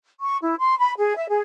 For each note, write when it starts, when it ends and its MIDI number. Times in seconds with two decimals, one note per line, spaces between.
0.20 0.37 85
0.42 0.54 64
0.58 0.78 84
0.78 0.93 83
0.98 1.16 68
1.16 1.28 76
1.28 1.41 68